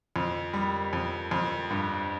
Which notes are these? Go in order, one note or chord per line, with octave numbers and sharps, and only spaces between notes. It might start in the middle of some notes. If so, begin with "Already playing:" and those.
F2
G3
F2
F2
G2